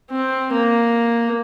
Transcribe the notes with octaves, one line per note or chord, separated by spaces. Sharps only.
C4
A#3